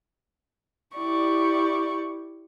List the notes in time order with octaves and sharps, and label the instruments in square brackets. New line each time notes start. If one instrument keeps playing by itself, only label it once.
[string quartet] E4 G4 D5 C#6